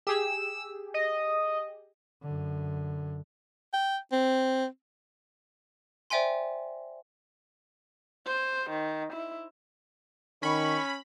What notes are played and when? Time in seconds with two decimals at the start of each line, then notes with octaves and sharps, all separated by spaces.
0.07 G4 G#4 E6
0.94 D#5
2.22 F#2 D3
3.73 G5
4.12 C4
6.10 C5 D5 E5 G5 G#5 C6
8.26 C5
8.70 D#3
9.13 E4
10.43 D#3 C#4 B5 C#6